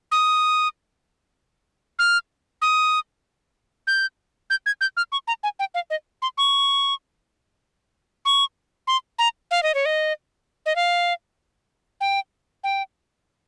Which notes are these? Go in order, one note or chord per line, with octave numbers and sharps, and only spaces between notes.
D#6
F6
D#6
G6
G6
G#6
G6
F6
C#6
A#5
G#5
G5
F5
D#5
C6
C#6
C#6
C6
A#5
F5
D#5
C#5
D#5
D#5
F5
G5
G5